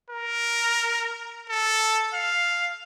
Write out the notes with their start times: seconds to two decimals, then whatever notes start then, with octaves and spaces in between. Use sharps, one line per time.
0.10 A#4
1.49 A4
2.14 F5